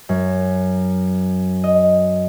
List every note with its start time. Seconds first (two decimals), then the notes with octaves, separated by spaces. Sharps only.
0.09 F#2
1.64 D#5